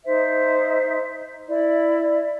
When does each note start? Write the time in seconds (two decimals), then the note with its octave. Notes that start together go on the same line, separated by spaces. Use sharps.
0.05 D#4 C5 E5
1.48 E4 D5